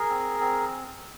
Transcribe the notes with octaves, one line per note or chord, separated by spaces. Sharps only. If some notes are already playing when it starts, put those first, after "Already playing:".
Already playing: G#4 A#4
C4
C4